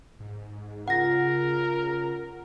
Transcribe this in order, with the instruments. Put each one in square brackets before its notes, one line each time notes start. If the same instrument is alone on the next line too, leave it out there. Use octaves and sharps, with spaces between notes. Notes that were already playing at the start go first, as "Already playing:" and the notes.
[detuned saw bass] G#2
[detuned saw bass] C#3 [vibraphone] F4 [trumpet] A#4 [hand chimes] F#5 A#6